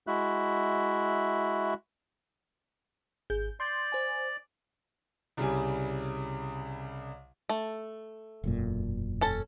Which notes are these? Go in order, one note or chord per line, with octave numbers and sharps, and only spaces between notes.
G#3 E4 F#4 E5 F#6
G#1 G#4 G6
D5 C6 G6
C5 G#5
C2 C#3 G3 G#5
A3
E1 F#2 A#2
C#4 A4 A5